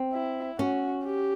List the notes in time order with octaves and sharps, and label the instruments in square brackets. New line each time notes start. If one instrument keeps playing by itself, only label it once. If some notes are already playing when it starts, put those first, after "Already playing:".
Already playing: [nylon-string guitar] C4
[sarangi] E4
[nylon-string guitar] C#4 [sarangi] F#4
[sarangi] G4